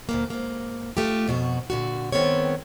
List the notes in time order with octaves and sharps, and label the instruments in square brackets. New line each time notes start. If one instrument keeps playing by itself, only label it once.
[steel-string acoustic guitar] D2 A#2 A#3
G#2 A#3
A3 F4 G4
F2 B2 F#4
A#2 D3 F#4
G2 D#3 B3 C4 A4 C#5